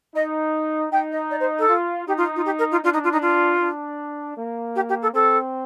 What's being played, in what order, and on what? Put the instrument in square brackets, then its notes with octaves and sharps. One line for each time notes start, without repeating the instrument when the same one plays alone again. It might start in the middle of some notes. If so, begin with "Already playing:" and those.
[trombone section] D#4 [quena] D#5
[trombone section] D#4 [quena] G5
[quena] D#5
D5
C5
A4
[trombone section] F4
[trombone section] D#4 [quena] G4
[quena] F4
F4
G4
A#4
F4
[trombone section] D4 [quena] F4
[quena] D#4
F4
D#4
F4
[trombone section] D4
A#3
[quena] G4
G4
A4
[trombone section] C4 [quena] A4